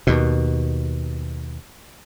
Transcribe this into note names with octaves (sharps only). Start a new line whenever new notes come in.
D#2 B2